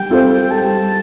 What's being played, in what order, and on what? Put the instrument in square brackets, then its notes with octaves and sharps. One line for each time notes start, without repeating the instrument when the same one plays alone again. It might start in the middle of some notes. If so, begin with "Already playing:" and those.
Already playing: [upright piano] G3 [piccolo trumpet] G5
[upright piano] C4 F4 A4 C5
[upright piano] G3 [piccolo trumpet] A5